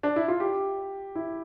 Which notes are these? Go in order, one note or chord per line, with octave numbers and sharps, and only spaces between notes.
D4
E4
F4
G4
E4